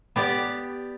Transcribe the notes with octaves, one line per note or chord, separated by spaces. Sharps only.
B3 G4 D5